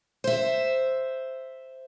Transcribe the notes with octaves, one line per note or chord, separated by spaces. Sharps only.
C5 E5